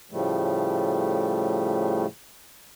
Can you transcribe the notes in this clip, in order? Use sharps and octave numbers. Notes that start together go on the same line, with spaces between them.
A2 C#3 F3 G3 A3